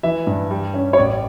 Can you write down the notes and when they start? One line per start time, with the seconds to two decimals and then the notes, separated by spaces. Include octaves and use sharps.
0.03 E3 E5
0.27 G2
0.51 G3
0.74 C#4
0.93 C#5
0.98 A1 D5